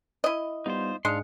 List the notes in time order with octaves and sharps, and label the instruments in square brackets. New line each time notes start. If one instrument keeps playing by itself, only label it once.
[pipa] E4 D#5
[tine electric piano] G3 B3 [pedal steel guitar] D#4 F4 C5
[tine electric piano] G#2 D4 C#7 [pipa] G#3 [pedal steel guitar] F5 C6